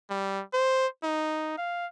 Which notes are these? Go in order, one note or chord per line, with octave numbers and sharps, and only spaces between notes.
G3
C5
D#4
F5